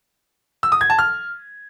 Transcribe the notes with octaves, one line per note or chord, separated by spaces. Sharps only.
E6
D#6
G#6
A5
F6